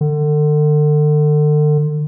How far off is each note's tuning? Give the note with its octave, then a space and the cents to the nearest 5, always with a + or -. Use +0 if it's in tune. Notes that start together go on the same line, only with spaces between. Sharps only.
D3 +35